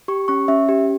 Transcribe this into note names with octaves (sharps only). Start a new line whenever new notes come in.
G4 C#6
C#4 C#6
C#4 E5
G4